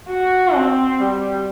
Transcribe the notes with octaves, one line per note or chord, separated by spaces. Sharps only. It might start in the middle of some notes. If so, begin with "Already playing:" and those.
F#4
C4
G3